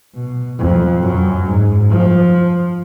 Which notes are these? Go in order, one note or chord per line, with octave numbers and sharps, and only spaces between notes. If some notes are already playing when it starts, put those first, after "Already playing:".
B2
F2
F#2
G#2
F3